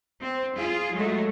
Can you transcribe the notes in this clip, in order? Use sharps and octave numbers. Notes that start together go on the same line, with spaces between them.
C4
F4 G#4
F#3 G#3 A3